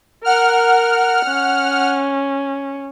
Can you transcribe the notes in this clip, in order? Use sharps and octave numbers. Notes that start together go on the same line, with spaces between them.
A#4 F#5 F6
C#4